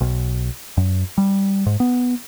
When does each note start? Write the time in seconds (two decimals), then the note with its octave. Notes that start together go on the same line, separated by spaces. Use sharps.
0.01 B1
0.77 F#2
1.18 G3
1.66 G#2
1.80 B3